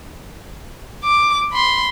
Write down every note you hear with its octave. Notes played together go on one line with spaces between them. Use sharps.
D6
B5 C6